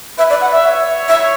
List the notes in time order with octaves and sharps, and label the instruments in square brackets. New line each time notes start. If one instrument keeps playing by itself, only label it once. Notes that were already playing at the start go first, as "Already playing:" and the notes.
[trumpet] B4 [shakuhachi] E5
[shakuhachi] D5
F#5
E5
[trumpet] C#5
[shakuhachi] E5